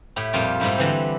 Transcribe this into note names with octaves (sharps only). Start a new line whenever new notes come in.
A2 E4 G4
F2 A#2 G3 F4 G5
G#2 G3 D#4 E4 G4
D3 E3 C4